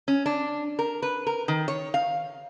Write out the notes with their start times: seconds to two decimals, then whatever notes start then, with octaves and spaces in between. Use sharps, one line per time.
0.08 C#4
0.26 D4
0.79 A#4
1.02 B4
1.27 A#4
1.48 D#3
1.68 C#5
1.94 F5